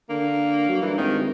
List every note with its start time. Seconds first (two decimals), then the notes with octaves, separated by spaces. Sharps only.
0.10 D3 A#3
0.69 F#3
0.82 G2 E3
0.98 G#1 D#3